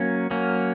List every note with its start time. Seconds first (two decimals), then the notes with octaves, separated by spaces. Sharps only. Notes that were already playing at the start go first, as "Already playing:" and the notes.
Already playing: F#3 A#3 C#4
0.31 F#3 A#3 C#4